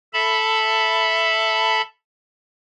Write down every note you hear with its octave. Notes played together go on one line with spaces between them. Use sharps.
A4 E5 A5 B5